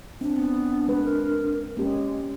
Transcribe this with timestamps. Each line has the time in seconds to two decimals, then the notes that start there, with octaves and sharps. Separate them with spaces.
0.21 C4 D4
0.34 B3
0.88 G#3 B4
1.04 A#4
1.77 G#3 A#3 C#4 G4